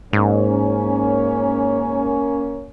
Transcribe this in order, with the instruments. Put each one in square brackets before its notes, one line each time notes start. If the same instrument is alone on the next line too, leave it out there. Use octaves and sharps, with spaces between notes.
[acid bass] G#2 [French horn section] A#3 C#4